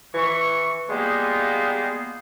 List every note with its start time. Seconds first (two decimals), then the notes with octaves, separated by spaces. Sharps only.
0.13 E3 C#6
0.89 G3 G#3 A#3 B3 D#4 F4